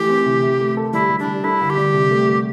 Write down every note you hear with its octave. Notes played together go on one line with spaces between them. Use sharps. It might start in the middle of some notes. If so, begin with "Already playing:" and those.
Already playing: E3 A3 G4
C4
C3
E4
A3
A4
G3 E4
G3
D4
G3
E4 A4
D3
G4
G3
C3
A3
A3